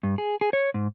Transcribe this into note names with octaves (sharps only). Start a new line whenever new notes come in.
G2
G#4
G#4
C#5
G#2